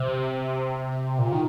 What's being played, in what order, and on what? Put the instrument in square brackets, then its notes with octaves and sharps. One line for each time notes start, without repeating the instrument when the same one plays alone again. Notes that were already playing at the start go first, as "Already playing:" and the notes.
Already playing: [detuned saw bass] C3
A#2
D#3